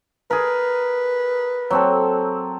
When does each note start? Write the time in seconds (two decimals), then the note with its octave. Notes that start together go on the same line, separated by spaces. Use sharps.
0.31 G#4 A#4 B4
1.70 F#3 C4 A4